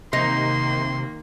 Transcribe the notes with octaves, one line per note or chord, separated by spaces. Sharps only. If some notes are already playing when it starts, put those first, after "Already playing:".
C3 D#3 A#3 D#4 C6